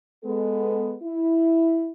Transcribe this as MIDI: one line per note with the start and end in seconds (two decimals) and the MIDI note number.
0.24 0.94 56
0.24 0.94 59
0.24 0.94 69
1.03 1.92 64